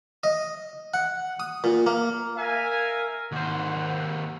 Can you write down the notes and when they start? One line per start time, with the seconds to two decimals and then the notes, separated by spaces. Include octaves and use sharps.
0.24 D#5
0.94 F#5
1.40 D#6
1.64 A#2
1.86 A#3
2.36 A#4 E5 F5 G#5
3.32 D#2 G#2 C5 F#5